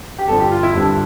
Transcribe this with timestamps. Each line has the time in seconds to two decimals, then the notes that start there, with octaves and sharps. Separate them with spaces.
0.19 G4
0.27 G2 D3 F3 A4
0.40 G4
0.51 F4
0.63 E4
0.75 G2 D3 F3 G3